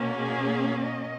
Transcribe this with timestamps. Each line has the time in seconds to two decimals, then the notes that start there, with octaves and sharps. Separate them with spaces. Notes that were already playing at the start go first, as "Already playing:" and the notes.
Already playing: B2 A#3 C#4
0.18 G#4
0.80 D#5